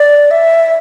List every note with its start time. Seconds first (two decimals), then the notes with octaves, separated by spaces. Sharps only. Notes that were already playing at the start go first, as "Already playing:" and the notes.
Already playing: D5
0.31 E5